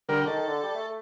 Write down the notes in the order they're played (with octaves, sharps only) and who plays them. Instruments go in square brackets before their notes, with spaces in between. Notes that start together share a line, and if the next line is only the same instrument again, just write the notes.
[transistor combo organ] D3 G3 [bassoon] A#4
[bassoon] D#3 [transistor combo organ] A4
[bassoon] D3
G3
A3